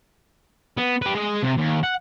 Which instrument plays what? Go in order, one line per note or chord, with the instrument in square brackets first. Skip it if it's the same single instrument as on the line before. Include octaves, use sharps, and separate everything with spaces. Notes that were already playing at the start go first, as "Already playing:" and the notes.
[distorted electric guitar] B3
G4 B4
G#3 D#5
C3
D#2
F#5